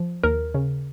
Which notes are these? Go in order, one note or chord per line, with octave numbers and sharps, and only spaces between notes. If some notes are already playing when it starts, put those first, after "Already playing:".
Already playing: F3
D#2 A#4
C#3